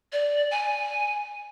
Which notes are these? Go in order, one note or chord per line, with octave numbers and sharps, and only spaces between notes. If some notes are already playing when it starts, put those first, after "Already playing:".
D5
G#5